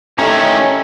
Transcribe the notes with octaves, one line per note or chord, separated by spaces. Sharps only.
A2 D#3 C#4 G4 A4 D#5 E5 A#5